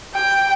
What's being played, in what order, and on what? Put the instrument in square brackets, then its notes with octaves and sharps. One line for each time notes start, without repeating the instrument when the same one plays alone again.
[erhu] G5